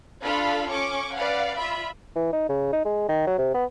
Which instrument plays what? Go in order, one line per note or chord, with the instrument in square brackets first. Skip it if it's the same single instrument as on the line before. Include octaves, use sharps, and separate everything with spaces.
[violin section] D4 F4 A4 F5 B5
C#4 C#6 D6
B4 D5 F5 F#5
F4 E5 B5
[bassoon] E3
D#4
C#3
D#4
G#3
D#3
F#3
C3
B3